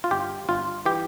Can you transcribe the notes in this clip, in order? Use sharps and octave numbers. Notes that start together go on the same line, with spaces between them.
F4
G1 G4
G1 F4
E3 G4